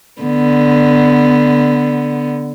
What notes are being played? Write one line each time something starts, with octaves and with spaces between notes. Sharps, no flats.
D3 B3